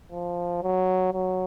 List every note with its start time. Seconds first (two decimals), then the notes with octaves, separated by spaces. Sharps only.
0.12 F3
0.63 F#3
1.13 F#3